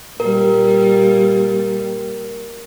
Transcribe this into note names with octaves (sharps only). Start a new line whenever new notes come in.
A#2 G3 A#4